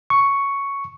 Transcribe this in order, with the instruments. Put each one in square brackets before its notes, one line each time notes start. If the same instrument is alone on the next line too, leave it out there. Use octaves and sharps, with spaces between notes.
[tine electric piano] C#6